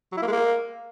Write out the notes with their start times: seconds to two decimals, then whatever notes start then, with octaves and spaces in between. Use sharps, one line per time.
0.12 F#3
0.17 E4
0.22 A#3
0.27 G#3
0.32 A#3